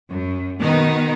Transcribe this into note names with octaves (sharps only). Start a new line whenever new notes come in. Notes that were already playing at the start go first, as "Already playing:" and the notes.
F#2
B2 D#3 B3 D#4